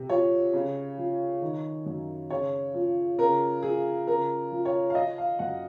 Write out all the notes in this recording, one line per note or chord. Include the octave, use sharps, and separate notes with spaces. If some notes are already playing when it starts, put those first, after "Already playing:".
Already playing: C3
F3 C#5
C#3
F3
D#3
F#2
C#3 C#5
F3
C#3 A#4
F3 G#4
C#3 A#4
F3
C#5
F5
F3 D#5
F5
F#2 F#5